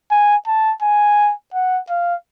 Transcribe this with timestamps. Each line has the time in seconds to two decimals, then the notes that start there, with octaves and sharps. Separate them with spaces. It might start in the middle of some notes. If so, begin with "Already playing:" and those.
0.11 G#5
0.47 A5
0.82 G#5
1.54 F#5
1.90 F5